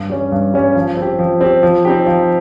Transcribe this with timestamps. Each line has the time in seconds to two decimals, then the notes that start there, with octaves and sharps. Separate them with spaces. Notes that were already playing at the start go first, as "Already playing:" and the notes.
Already playing: G2
0.10 G3 C#4
0.32 G2
0.54 G3 C#4
0.75 F3
0.97 C4 G4
1.19 F3
1.41 C4 G4
1.63 F3
1.85 C4 D#4 G4
2.07 F3